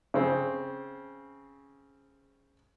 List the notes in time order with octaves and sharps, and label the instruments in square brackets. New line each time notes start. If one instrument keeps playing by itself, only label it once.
[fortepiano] C#3 C4